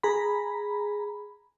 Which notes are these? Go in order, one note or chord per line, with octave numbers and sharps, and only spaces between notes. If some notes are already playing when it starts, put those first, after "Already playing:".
G#4 A#5 B5